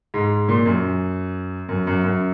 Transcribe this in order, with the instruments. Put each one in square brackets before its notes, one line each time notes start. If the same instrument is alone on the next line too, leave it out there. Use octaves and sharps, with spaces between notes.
[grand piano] G#2
A#2
F#2
F#2
F#2
F#2